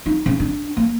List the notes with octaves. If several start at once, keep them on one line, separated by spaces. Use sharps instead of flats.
D#4
C#3
D4
A#3